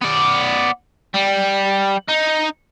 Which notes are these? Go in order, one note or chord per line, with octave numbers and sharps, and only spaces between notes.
B3 D5
G3
D#4